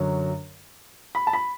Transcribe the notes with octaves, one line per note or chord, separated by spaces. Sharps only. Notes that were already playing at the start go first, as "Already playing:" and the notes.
Already playing: F#2 D3 F#3
B5
A5
B5